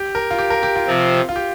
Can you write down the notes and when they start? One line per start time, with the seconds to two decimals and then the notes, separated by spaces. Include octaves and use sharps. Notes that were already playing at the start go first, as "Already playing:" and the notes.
Already playing: G4
0.15 A#4
0.31 F4
0.39 G4
0.50 A#4
0.63 G4
0.76 F4
0.87 C3 F3 C4
1.29 F4
1.36 G4